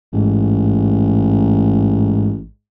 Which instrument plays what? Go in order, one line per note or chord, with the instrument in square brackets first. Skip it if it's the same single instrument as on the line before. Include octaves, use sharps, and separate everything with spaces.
[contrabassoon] A1 [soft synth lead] G#2